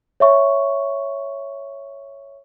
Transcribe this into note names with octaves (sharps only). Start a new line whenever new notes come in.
C#5 E5 C#6